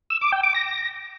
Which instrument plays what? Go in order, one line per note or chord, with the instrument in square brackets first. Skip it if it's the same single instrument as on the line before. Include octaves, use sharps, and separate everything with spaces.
[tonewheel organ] E6
D6
G5
D6
A#6